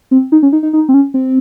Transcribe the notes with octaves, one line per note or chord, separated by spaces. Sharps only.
C4
D#4
C#4
D#4
D#4
D#4
C4
C#4
C4